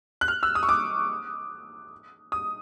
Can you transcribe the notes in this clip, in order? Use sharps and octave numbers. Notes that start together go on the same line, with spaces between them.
F#6
F6
E6
D#6
C#6
D6
D#6